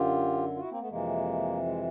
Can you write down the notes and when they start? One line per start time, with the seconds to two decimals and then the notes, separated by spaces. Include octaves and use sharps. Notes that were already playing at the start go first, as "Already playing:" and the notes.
Already playing: F#2 D3 F4 G4
0.56 F4
0.61 E4 F#4
0.71 A#3 C4
0.80 A3 B3
0.89 F2 C3 E3 G#3 A#3
1.65 G#3